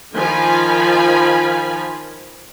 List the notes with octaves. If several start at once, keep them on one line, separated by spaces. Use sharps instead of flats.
D#3 F3 F4 G#5 B5